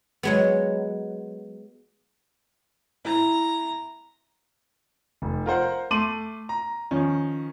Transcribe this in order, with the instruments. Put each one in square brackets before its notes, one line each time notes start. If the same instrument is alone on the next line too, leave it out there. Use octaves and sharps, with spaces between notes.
[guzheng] F#3 G#3 B3
[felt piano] E4 [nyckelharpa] A#5
[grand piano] F1
F4 A#4 C5 F#5
A3 A5 C6 D6 D#7 F#7
A#5
D#3 F3 C#4